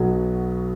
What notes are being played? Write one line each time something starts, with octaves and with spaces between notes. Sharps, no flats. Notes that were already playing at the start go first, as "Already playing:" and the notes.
Already playing: B1 B2 F#3